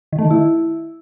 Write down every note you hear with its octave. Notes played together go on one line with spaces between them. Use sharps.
D#3
A3
D#3
E4